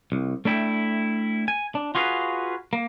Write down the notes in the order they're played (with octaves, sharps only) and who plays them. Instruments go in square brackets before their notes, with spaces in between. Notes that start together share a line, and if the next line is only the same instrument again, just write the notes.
[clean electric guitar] C2
A3 D4 E4 G5
G#5
D4
F4 F#4 G#4 B4 F5
A#3